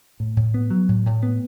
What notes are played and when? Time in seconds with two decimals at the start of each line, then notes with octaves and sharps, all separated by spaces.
0.20 A2
0.37 A2
0.54 B3
0.70 F#3
0.89 A2
1.06 A2
1.23 B3